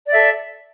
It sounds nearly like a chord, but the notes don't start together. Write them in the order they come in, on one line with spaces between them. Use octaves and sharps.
D5 E5 A4